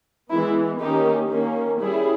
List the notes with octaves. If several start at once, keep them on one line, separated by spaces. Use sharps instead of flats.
E3 G#3 B3 E4
D#3 A#3 C#4 D#4 G4
D#3 A#3 C#4
G3 C#4 E4 G#4